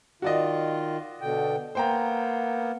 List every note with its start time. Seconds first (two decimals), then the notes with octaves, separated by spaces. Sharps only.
0.22 D#3 F4 F#4 D5 D#5
1.21 B2 D3 G5
1.75 A#3 B3 C5 G5 A#5